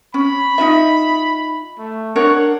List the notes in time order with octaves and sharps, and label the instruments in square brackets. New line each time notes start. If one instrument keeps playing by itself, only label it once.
[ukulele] C#4 [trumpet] B5
[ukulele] D#4 F4 E5
[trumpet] A3
[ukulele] D4 A#4 C#5 [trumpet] F#5